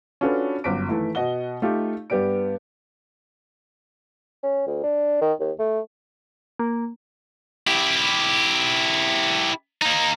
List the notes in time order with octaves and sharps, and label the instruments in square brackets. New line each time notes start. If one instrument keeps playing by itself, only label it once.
[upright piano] C#4 D4 F4 F#4 A4 B4
G1 F#2 D6 B6 D7
D#3 E3 A3 E4
B2 D#5 F#5 G7
A3 D#4 F4 G4
G2 B3 G4 D5 D7
[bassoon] C#4
D2
D4
D#3
D#2
A3
[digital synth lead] A#3
[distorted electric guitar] E4 G4
A#3 D#4